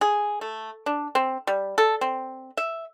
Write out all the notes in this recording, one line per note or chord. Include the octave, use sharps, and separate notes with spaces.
G#4
A3
D4
C4
G3
A4
C4
E5